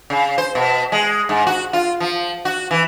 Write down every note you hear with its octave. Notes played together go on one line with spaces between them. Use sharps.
C#3
C5
B2
G#3
G#2
F#4
F4
F3
F#4
E3